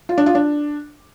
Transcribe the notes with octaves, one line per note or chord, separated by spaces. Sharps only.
F4
D4
F4
D4